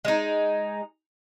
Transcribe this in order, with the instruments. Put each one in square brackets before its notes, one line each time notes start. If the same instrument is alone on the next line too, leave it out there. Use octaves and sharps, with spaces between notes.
[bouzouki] G#3 D#4